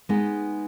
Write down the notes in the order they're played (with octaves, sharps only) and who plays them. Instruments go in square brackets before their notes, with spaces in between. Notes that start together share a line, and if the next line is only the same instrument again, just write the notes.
[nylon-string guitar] G#3 B3 D#4